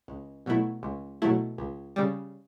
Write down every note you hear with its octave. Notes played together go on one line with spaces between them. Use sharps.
C#2
B2 F#3 A3 E4
C#2
B2 F#3 A3 E4
C#2
C#3 G3